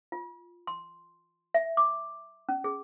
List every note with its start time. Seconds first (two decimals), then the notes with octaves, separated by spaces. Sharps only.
0.12 F4
0.67 C6
1.54 E5
1.77 D6
2.49 C#4
2.64 G#4